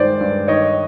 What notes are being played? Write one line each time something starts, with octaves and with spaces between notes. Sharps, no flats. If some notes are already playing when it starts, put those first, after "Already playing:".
Already playing: G2 D#3 G#3 C5 D5
G2
D#3 C#5 D#5